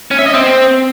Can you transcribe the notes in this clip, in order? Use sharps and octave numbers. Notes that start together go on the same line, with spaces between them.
C#4
E5
D#5
C4